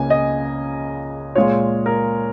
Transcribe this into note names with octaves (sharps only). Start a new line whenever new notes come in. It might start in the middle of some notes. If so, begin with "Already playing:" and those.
Already playing: C#2 C#3 A#3 C#4 F4 G#5
D#5
A#2 G#3 F4 C#5
A#4